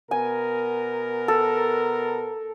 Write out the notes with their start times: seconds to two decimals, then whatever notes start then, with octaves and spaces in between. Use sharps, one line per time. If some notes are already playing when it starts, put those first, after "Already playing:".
0.11 B2 B3 A#4 G#5
1.28 A4